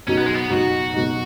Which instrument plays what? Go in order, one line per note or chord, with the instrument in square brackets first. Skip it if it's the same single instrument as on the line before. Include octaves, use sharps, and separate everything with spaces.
[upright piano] B2 F#3 D#4 [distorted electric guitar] C#4
[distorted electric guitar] B3
G#3
B3
[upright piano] B2 F#3 D#4 [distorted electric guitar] F#4
[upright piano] B2 F#3 D#4